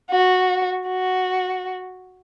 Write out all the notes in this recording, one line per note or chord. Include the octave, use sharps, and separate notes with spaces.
F#4
F#4